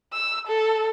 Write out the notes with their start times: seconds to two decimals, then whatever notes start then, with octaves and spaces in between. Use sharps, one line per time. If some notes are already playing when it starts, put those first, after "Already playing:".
0.13 E6
0.47 A4